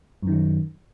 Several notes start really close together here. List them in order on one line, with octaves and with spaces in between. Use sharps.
F#2 D#3 F#3